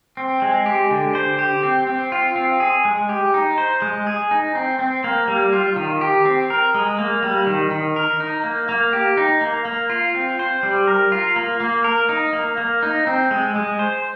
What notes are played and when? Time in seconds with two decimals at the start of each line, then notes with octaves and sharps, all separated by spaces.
0.17 C4
0.42 G#3
0.66 G4
0.91 D3
1.15 C5
1.39 G4
1.63 C4
1.87 C4
2.12 F4
2.36 C4
2.60 G#4
2.85 G#3
3.09 G4
3.34 D#4
3.58 C5
3.82 G#3
4.07 G#4
4.31 D#4
4.55 C4
4.79 C4
5.04 A#3
5.28 G3
5.53 F4
5.76 D#3
6.01 G4
6.25 C4
6.50 A#4
6.74 G#3
6.99 A#3
7.23 G3
7.47 D#3
7.71 D#3
7.96 A#4
8.20 D#4
8.44 A#3
8.69 A#3
8.93 G4
9.17 D#4
9.41 A#3
9.65 A#3
9.90 F4
10.15 C4
10.39 C5
10.63 G3
10.88 A#4
11.12 F4
11.36 A#3
11.60 A#3
11.84 A#4
12.09 D#4
12.33 A#3
12.58 A#3
12.83 D#4
13.07 C4
13.31 G#3
13.56 G#3
13.79 C5